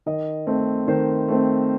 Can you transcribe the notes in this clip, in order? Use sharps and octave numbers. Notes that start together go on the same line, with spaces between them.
D#3 D#5
A3 C4
D#3 C5
A3 C4